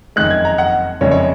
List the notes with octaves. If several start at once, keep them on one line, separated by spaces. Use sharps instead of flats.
F#1 F2 D#3 G#3 F#6
G#6
A#5
F#5
F#1 F2 C#3 G#3 C#5
C#5